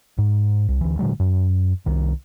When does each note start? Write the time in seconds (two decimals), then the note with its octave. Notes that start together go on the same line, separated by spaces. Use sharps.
0.18 G#2
0.68 C2
0.81 D2 E3
0.99 A#2 D3 F#3 G#3
1.19 F#2
1.86 C2 D#3